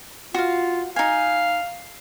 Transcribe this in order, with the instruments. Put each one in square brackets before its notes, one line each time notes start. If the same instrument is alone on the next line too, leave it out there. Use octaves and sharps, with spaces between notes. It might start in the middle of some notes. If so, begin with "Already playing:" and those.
[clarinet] F4 [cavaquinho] F#4 F5
[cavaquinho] D#4 G#5 [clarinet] F5